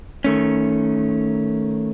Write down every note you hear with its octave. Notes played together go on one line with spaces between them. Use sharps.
D#3 A3 C#4